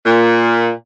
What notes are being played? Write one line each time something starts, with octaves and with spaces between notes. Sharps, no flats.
A#2